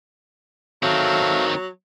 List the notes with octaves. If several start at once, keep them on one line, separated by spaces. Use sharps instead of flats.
D#3 F#3 C4 A4 E5 F5